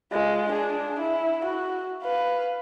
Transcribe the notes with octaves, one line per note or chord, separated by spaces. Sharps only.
G#3 F4
D4 G#4
E4
F#4
B4 F5